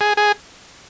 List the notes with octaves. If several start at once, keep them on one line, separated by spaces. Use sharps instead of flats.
G#4
G#4